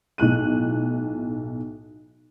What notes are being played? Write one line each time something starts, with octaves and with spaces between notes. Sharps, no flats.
B1 A2 F#6 D#7